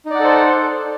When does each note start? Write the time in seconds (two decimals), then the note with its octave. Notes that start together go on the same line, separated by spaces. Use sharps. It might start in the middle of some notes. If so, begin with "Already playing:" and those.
0.06 D#4
0.10 D5
0.15 F#5
0.20 A4
0.24 C5